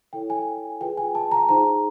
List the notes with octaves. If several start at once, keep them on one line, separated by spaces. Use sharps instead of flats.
E4 A4 C#5 G5
G#5
F4 G#4 B4 G5
G#5
A5
A#5
D#4 G#4 C5 A#5